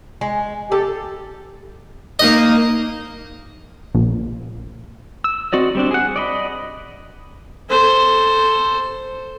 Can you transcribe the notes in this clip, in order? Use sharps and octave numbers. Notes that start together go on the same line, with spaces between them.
G#3
G4 A4
A#3 D#4 D#5
A#1
E6
C4 F#4 D5 D#5
G3 C4 D4
G#4 F#5
D5 D#5 B5
A4 C5